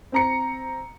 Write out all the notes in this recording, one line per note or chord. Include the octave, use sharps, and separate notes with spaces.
C4 A#5 C#7